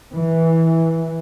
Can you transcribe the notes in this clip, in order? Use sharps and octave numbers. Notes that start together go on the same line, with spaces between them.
E3